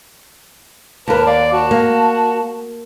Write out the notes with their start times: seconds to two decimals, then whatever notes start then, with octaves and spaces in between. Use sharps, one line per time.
1.08 D#2 A#4 B4 A5
1.26 D5 F5
1.53 F#4 A5
1.71 A#3